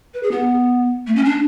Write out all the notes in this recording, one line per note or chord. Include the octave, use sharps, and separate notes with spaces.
B4
G#4
B3
A3
C#4
D4